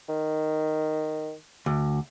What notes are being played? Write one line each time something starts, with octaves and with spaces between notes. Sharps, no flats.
D#3
D2